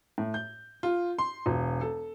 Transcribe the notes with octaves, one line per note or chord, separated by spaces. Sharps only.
A2
G6
F4
C6
E1
A4